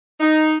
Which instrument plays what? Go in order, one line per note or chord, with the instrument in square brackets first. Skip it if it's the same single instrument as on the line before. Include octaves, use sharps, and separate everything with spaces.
[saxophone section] D#4